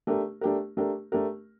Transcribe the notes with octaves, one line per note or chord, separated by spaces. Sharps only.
A3 D4 G4 A#4
A3 D4 G4 A#4
A3 D4 G4 A#4
A3 D4 G4 A#4